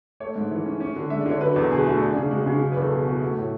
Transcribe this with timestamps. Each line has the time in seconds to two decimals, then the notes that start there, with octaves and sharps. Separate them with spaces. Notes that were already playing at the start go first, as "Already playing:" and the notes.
0.20 A3 C#5
0.36 G#2
0.51 E3
0.66 C#4
0.80 C#4
0.96 D3
1.10 G#3 E5
1.21 D5
1.26 D3
1.31 C#5
1.41 F#3 B4
1.56 E2 A4
1.71 B2 G#4
1.86 A3 F#4
2.01 D4 G#4
2.16 C#3 G#4
2.31 G#3 F#4
2.41 G#4
2.46 C#3
2.52 F#4
2.61 F#3 G#4
2.72 B4
2.76 E2
2.82 A4
2.91 B2 G#4
3.07 B3 F#4
3.21 A3 F#4
3.37 A2